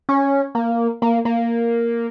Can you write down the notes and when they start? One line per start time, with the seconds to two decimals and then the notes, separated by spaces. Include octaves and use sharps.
0.09 C#4
0.55 A#3
1.02 A#3
1.25 A#3